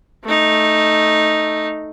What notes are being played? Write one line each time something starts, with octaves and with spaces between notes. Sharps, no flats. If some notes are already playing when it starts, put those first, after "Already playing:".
A3 D#4